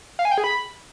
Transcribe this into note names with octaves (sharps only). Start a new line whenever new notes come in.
F5
G#5
G5
G#4
B5